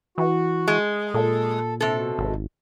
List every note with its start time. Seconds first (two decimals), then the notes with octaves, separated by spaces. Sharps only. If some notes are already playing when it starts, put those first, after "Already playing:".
0.18 E3 F#4
0.68 G#3
1.14 A#2 A4
1.81 C3 A4
1.92 B2
2.19 G#1